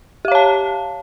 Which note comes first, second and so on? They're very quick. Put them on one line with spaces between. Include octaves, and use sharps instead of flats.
G4 F5 C#5 A5